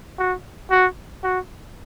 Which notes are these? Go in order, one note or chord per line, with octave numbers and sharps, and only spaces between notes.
F#4
F#4
F#4